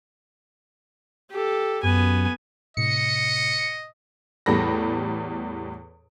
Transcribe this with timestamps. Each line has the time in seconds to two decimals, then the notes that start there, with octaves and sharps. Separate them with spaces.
1.31 G4 A4
1.83 F#2 B3 G#5
2.77 A2 C3 D#5 C#7
4.46 E2 A2 G3 A4 B5 A#6